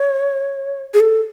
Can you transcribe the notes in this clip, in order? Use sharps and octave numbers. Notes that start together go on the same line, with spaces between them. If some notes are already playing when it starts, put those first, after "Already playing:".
Already playing: C#5
G#4
A4